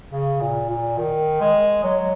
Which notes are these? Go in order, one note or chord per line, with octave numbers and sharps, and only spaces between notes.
C#3
A#2
A#2
D#3
G#3
F#3